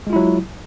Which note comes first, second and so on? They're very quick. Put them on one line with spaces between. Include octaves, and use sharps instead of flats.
G#3 F4 E4 F#3